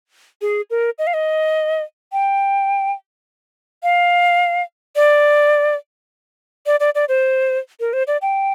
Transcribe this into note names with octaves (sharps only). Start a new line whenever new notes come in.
G#4
A#4
D#5
F5
D#5
G5
F5
D5
D5
D5
D5
C5
A#4
C5
D5
G5